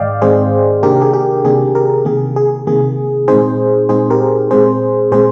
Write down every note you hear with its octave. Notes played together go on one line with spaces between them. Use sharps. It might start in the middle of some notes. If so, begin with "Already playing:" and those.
Already playing: G#2 D#3 G#3 D5 D#5 F5 G5
G#2 D#3 G#3 C4 G#4 C5
C3 D#3 A#3 D4 G4 A#4
G#4
G4
C3 D#3 A#3 D4 G#4
G4 A#4
C3 D#3 A#3 G#4
G#4
C3 D#3 A#3 G#4
A#2 G#3 C4 D#4 G#4 C5
A#2 G#3 C4 D#4 G#4 C5
G4 A#4
A#2 G#3 C4 G#4 C5
A#2 G#3 C4 G#4 C5